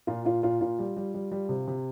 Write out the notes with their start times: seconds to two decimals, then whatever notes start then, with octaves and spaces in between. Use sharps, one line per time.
0.07 A#2 F4
0.25 A#2 F4
0.43 A#2 F4
0.61 A#2 F4
0.79 G3
0.97 G3
1.14 G3
1.32 G3
1.49 C3
1.68 C3